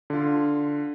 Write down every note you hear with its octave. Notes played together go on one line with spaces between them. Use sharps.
D3 F4